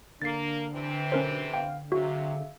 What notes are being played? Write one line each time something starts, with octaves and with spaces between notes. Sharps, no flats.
D3 A#3 D4 A6 C7
C3 E3 C4
B1 C#4 A#4 C5
B3 F5 G5
C3 F#3 F#4 G#4 E5 F5